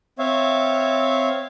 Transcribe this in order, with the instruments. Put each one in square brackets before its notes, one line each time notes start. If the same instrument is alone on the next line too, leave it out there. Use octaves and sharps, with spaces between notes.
[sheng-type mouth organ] C4 C#5 E5 F5